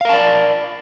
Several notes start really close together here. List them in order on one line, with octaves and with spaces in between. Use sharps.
F5 A#4 A5 D5